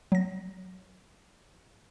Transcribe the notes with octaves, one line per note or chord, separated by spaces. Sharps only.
F#3 A#6